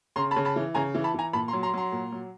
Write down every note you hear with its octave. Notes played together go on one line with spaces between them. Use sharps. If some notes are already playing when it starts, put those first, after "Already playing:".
C#3 A#5 C6
A5 B5
C#3
A5 B5
E3
C#3 G#5 A#5
E3
A5 B5
E3 G#5 A#5
A#2 A5 B5
A#5 C6
F#3
A#5 C6
F#3 A#5 C6
A#2
F#3